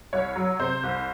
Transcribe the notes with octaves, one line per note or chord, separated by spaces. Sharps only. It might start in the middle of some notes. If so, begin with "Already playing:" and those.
C2 C#5
F#3
C3 C5
C2